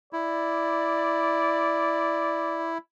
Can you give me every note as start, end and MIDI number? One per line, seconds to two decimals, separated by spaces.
0.13 2.78 64
0.13 2.73 74